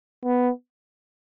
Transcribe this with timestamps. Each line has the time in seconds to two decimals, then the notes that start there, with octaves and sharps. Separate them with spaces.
0.25 B3